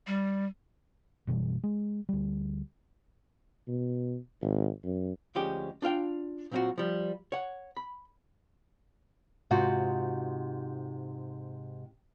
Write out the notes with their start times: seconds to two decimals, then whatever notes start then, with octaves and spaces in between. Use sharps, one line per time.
0.07 G3
1.27 F#1 B2 E3 G3
1.64 G#3
2.09 D2 G3
3.68 B2
4.42 G#1
4.84 F#2
5.35 D2 F3 G#3 C#4 G4 G5
5.82 D4 F4 F5 G5
6.51 A#2 F#3 C4 D#4 F4 F#4
6.78 F3 G3
7.32 C#5 F#5
7.77 B5
9.51 G#2 C3 F4 F#4